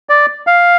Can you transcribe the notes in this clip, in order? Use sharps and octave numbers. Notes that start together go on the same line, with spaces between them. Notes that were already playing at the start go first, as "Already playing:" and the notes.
D5
F5